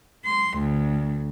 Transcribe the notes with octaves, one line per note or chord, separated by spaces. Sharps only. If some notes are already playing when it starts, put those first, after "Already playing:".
C6
D2